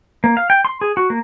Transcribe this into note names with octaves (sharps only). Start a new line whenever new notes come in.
A#3
F5
G5
C6
G#4
F#4
A#3